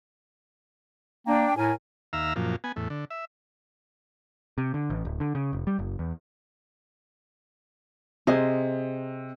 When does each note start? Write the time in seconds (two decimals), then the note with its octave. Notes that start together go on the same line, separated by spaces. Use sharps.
1.27 A#3 D4 G5
1.57 A2 A#4 G#5
2.13 D#2 E5 F5 A#5 E6
2.36 F#2 A#2 F3
2.64 B3 G#5
2.76 E2 A2
2.90 D3
3.10 E5
4.58 C3
4.74 D3
4.90 A1
5.05 D1
5.20 D3
5.35 C#3
5.53 F1
5.67 G3
5.79 F#1
5.99 E2
8.27 C3 G#4 C5 D#5